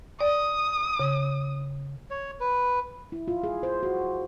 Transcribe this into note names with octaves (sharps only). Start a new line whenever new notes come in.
D5 D#6
C#3
C#5
B4
E4
F4
G#4
C5
F#4